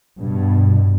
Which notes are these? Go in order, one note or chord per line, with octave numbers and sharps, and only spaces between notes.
G2 B2